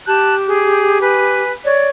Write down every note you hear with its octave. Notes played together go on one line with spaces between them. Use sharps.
G4 A5 F#6 G6
G#4
B4 G#5
C#5 D5